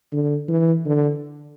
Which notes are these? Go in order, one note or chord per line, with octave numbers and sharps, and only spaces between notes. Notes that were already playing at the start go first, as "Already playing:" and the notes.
D3
E3
D3